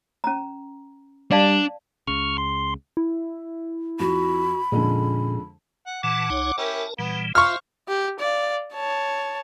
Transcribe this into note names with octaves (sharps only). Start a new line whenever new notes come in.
C#4 A#5
G3 D4 D5 F5 A5
C#2 C#3 C#6 F6
C6
E4
F2 F#4 B5
F2 A#2 D3 G#3 C#4
F#5
A#2 E3 F#5 A5 D6
C2 D#4 C#5
C#4 E4 G4 A#4 A5
A#2 E3 G3 B3
F4 C5 E5 F5 C#6 F6
G4
D5 F5
C#5 A5